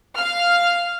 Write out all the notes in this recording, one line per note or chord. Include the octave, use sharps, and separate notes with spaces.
F5 F6